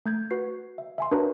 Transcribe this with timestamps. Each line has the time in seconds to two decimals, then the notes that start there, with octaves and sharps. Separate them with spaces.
0.06 A3 G6 G#6
0.31 F#4 B4 C7
0.78 E5
0.98 E5 G#5 C6
1.11 D4 F#4 A#4 B4 C#5 A#5